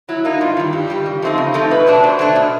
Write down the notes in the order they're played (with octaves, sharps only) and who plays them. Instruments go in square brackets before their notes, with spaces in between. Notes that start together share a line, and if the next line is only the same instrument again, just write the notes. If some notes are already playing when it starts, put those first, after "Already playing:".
[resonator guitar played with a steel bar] F#3 [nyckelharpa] E4
[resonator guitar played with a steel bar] A#3 D#4
[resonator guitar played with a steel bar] G2 [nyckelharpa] F4
[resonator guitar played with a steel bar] D#3 G3
[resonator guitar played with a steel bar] G2 [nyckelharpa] G4
[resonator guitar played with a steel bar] D#3 G3
C#3
F3 A3 C4 D#4
C#3
F3 A3 C4 D#4
[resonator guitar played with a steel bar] B2 [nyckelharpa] B4
[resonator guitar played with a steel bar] F#3 A3 D4
[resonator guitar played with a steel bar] B2 [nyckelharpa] C5
[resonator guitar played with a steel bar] F#3 A3 D4
B2